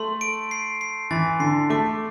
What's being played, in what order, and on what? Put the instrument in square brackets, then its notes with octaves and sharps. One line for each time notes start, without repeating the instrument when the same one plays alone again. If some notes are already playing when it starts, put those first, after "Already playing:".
Already playing: [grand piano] A3 [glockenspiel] C6
[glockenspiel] D7
C7
C7
[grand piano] E3 [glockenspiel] A6
[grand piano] D3 [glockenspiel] C7
[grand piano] A3 [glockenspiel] D6